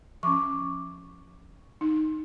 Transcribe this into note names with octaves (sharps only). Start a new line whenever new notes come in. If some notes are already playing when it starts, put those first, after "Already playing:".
F3 C#4 C#6 D6
D#4